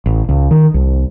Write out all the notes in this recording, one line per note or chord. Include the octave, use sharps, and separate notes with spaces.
A1
C#2
D#3
C2